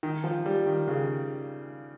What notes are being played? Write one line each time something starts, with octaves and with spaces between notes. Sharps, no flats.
D#3
F3
G3
D#3
C#3